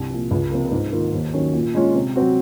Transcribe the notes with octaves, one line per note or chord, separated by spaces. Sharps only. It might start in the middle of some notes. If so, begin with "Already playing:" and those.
Already playing: C2
A#2 F3
C#2
C3 F3 A#3
G#2
D#3 A#3 F4
D#2
D#3 F#3 C#4
A#2
G#3 C#4 F4
C3
F#3 C4 F#4